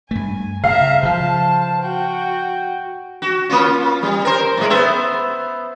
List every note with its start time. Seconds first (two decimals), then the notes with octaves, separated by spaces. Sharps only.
0.11 G2 A3 G#5
0.64 C#3 E5 F5 A#5
1.03 C#3 F3 C5 A5
1.81 F#4 G5
3.22 F#4
3.50 A#3 C#4 F4
4.03 G3
4.25 A#4 C5
4.57 A2 G#3
4.70 B3 C5 E5